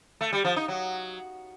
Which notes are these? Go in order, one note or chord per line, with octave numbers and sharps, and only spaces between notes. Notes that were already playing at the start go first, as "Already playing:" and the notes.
A3
G3
F3
D#4
F#3